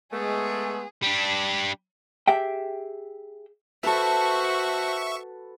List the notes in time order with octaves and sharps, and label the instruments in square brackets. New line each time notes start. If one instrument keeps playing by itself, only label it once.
[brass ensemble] G#3 [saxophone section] A3 [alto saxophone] B3 [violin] G#4
[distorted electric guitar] G3 D4
[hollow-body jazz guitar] G4 G#4 E5 G5
[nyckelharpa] F#4 C5 [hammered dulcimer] A4 B4 [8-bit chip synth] E5 C#6